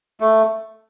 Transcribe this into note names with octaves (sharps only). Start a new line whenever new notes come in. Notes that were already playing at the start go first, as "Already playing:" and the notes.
A3